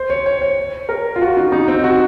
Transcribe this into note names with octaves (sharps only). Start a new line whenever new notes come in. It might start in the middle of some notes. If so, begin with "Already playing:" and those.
Already playing: C5
C#5
C#5
C#5
A#4
F4
F#4
D#4
D#4
C4
F#4